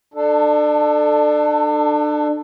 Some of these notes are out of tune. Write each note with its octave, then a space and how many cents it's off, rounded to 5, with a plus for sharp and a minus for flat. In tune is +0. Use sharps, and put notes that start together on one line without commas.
D4 +30 A4 +5